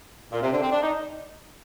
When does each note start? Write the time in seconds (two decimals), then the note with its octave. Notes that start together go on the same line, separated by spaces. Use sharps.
0.32 A#2
0.42 C3
0.52 D3
0.62 C4
0.72 D4
0.83 D#4